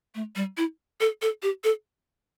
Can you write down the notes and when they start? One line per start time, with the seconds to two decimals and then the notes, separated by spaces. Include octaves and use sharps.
0.15 A3
0.36 G3
0.57 E4
1.00 A4
1.22 A4
1.43 G4
1.64 A4